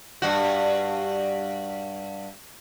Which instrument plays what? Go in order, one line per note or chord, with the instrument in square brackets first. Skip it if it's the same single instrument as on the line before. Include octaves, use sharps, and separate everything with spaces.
[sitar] G2 F#4